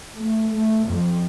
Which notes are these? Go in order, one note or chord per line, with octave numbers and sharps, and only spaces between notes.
A3
A3
F2